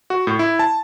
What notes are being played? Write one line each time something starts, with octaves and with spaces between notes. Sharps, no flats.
F#4
A2
E4
A5